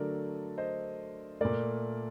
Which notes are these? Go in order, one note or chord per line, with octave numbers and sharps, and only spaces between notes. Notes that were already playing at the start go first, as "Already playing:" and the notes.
Already playing: D3 F#3 A3 A#4 D5
C5 D#5
A#2 A3 A#4 D5